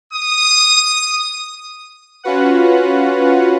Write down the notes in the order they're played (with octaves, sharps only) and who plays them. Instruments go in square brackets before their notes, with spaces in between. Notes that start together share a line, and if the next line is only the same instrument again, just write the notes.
[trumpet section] D#6
[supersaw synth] C#4 F4 F#4 B4 F#5